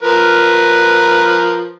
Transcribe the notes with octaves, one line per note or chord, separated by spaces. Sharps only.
F3 A#4 B4